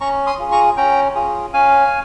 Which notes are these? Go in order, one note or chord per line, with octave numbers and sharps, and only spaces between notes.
C#4 A#5 C#6
C6 D#6
F4 G#4
A#5 C#6
C#4 G5 A#5
F4 G#4
C#4 F5 G#5